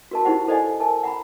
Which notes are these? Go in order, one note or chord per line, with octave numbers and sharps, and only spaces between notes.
F#4 A#4 A5
D#4 E4 G4 C5 F#5
A4 C5 D5 D#5 F#5 G#5
A#4 G#5 A5
F#5 A#5 B5